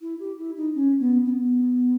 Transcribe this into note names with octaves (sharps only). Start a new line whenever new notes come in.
E4
G4
E4
D#4
C#4
B3
C#4
B3